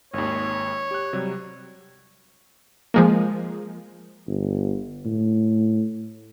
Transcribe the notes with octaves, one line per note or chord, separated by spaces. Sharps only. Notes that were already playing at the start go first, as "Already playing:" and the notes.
G#1 D#2 C#5
G4 F#6
C3 F#3 G3
F3 G#3 A#3
G1
A2